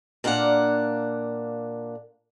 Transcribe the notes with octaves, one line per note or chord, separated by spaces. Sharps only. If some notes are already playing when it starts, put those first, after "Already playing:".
A#2 A#3 D4 F5 F#5